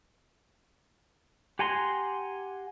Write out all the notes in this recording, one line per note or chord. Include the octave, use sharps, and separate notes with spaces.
G4 F#5 G#5 A#5 C6